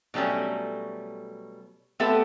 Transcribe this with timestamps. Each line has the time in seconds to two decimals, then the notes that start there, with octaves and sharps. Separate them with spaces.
0.14 B2 F#3 G3 A3 C#4
2.00 A3 B3 C4 G4 A4 E5